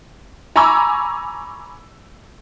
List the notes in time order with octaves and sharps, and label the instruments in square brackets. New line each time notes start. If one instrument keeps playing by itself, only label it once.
[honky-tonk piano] G#5 A#5 B5 C#6 D6 E6